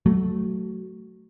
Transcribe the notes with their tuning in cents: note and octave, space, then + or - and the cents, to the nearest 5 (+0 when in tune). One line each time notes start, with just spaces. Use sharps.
F#3 +15 A3 +0